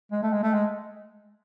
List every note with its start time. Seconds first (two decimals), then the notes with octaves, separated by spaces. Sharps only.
0.12 G#3
0.23 A3
0.33 G#3
0.43 A3
0.54 G#3